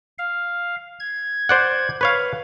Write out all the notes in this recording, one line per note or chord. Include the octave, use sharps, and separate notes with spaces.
F5
G#6
C5 D5 F#5
B4 C#5 F5